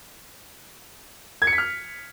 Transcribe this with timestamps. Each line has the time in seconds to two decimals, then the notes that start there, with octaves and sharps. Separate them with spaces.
1.42 G#6
1.47 C#7
1.53 B6
1.58 F6